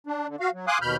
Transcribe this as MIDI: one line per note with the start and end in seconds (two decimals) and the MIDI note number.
0.07 0.27 62
0.28 0.36 50
0.40 0.50 66
0.40 0.50 77
0.54 0.66 54
0.67 0.78 77
0.67 0.78 80
0.67 0.78 84
0.67 0.78 86
0.67 0.78 87
0.67 0.78 90
0.82 0.96 39
0.82 0.96 47
0.82 0.96 83
0.82 0.96 89
0.82 0.96 91